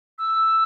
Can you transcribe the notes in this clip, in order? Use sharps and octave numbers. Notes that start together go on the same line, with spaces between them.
E6